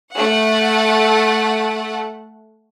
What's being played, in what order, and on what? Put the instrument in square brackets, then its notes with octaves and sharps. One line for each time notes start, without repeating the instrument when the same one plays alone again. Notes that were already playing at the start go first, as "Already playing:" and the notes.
[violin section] A3 F#5